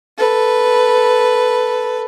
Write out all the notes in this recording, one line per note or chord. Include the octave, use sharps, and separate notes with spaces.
A4 B4